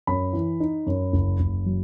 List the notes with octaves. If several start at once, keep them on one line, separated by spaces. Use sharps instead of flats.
F#2 B5
E3
D#4
F#2
F#1
F#1
F#3